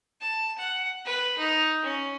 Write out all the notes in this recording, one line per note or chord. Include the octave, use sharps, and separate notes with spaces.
A5
F#5
B4
D#4
C#4